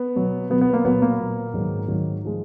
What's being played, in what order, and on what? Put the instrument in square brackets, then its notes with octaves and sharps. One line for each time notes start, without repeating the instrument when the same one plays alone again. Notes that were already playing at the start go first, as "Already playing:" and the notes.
Already playing: [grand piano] B3
B2 F#3
B2 F#3 B3
B3
A#3
A#2 F#3 B3
A#3
A#2 F#3
G#2 D#3 F#3
G#2 D#3 F#3
F3 G#3